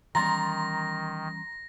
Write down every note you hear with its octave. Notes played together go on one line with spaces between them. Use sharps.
D#3 E3 G3 C#4 A#5 C6 A6 A#6